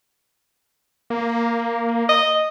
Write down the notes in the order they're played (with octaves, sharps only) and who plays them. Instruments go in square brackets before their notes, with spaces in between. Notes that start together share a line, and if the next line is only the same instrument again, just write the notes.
[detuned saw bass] A#3
[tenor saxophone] D#5